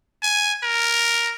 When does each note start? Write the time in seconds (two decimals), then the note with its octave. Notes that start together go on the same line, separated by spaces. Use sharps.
0.23 G#5
0.63 A#4